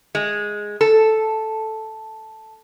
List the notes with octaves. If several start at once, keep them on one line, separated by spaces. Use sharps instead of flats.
G#3
A4